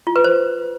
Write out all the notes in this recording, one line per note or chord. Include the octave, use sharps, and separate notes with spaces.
F4
B4
C5